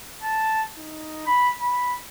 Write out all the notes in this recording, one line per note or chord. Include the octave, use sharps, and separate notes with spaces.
A5
D#4
B5
B5